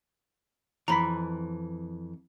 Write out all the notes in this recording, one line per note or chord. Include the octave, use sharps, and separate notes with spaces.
F2 E3 A#5 B5 B6